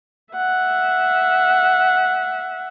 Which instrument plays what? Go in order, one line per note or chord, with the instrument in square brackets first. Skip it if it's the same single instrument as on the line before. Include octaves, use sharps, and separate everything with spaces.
[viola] E5 F#5